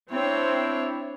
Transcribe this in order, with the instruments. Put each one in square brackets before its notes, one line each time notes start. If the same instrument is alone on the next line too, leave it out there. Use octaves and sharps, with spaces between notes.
[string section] C4 [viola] D4 C#5 [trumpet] E4